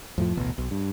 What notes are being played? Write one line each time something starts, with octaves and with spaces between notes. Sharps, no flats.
F2 A2 F3
A1 D2 B2
B1
G2